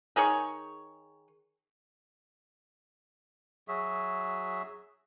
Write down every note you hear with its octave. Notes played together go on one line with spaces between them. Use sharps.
D#3 G#4 C#5 C#6
F#3 F#4 G#4 E5